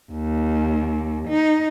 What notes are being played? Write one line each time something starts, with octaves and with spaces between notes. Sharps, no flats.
D#2
D#4